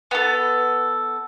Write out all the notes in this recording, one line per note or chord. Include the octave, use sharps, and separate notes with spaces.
B3 A4